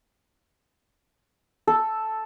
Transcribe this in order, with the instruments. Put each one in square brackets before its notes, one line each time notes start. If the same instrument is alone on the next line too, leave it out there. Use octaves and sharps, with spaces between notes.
[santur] A4